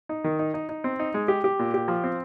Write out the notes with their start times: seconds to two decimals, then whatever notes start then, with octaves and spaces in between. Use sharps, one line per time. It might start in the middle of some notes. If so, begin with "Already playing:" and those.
0.09 D#4
0.24 D#3
0.39 D#4
0.54 D#4
0.69 D#4
0.84 C4
0.99 D#4
1.14 G#3
1.28 G4
1.44 G4
1.59 A#2
1.74 G4
1.88 F3
2.04 C4